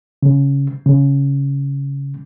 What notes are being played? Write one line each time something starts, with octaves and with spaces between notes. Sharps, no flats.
C#3
C#3